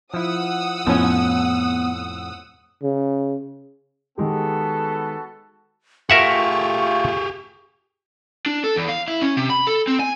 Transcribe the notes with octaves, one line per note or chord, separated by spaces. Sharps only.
F3 E4 F#5 D#6 E6
F2 A2 F3 B3 C#4 E4
C#3
D#3 G#3 B3 F#4 G4 A4
A3 F4 G4 G#4 A#4 E5 F#5 C#6
D4
A4
E2
F5
E4
C#4
C3
B5
A4
C4
G#5